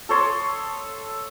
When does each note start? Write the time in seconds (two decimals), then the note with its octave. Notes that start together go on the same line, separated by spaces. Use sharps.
0.09 A4 C#5 C6 D#6